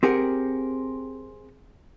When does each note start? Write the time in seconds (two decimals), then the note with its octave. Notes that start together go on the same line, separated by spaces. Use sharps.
0.03 C4 G4 G#4 A#4 F#5